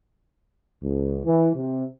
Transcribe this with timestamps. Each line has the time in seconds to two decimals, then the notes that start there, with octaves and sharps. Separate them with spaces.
0.83 C#2
1.24 E3
1.56 C3